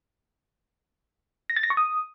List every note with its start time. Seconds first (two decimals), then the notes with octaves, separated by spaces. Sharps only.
1.50 A#6
1.56 A6
1.63 A#6
1.70 C#6
1.77 D#6